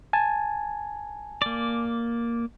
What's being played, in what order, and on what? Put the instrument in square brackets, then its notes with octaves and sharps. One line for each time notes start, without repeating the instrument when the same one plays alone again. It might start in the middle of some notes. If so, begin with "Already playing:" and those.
[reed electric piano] G#5 A5
[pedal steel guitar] A#3 D5